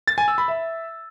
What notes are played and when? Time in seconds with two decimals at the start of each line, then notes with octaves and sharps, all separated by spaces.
0.08 A6
0.18 G#5
0.28 E6
0.38 B5
0.48 E5